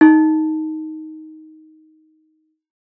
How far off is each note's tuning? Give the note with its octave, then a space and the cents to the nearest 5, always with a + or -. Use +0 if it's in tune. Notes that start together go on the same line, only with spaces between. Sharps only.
D#4 +10